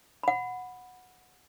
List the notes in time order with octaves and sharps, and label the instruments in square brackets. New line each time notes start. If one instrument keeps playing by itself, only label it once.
[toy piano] F#5 B5